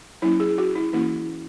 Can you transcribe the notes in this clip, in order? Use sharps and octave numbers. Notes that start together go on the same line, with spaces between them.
F#3 A#3 C#4 E4
G#4
F#4
E4
E3 A#3 C#4 E4